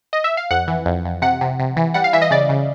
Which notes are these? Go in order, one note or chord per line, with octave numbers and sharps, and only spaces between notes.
D#5
E5
F5
F2 F#5
E3
F2
F2
C3 F#5
C3
C3
E3
G3 F#5
F5
E3 E5
D#5
C#3 D5
C#3